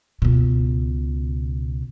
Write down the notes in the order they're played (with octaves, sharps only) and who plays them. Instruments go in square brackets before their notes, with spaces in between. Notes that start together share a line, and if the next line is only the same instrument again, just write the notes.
[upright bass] C#2 B2